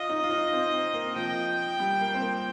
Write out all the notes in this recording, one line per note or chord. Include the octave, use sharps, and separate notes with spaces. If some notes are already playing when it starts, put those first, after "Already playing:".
Already playing: F4 D#5
D#4
F4
D#4
C4
C4
A#3
F3 G5
G3
A#3
C4
A#3